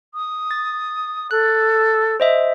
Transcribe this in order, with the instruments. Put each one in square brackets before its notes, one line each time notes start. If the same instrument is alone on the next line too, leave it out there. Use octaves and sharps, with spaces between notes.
[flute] D#6
[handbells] A6
[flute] A4 [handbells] F#6
[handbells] C5 D#5 E5